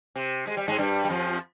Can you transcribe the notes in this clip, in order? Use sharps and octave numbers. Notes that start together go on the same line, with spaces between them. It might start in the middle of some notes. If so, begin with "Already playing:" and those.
C3
G#3
G3
G#2 G#3
G2 G3
G3
F2 F3